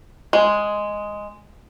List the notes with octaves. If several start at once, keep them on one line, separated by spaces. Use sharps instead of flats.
G#3